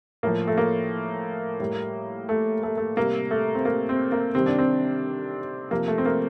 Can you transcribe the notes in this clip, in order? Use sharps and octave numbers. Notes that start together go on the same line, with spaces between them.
A2 F3 A#3
A3
A#3
A2 G3
A3
A3
A3
C3 G3 A#3
A3
C4
A#3
C4
A#3
C3 D#3 G3 C4
D4
C4
C3 F3 A#3
A3
C4
A#3